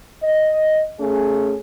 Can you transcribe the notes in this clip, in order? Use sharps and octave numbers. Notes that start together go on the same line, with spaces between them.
D#5
A3 C#4 G#4